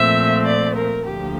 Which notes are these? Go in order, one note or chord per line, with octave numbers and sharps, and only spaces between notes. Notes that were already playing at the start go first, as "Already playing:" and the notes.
Already playing: A#2 F3 A3 C4 E5
D5
A#4
D2 D3 F3 A#3 G4